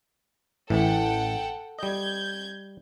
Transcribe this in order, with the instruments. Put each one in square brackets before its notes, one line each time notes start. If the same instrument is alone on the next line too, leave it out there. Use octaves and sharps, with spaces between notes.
[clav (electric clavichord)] A1 A2 E3 [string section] A4 F#5 G5
[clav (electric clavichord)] G3 D#5 [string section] G6 G#6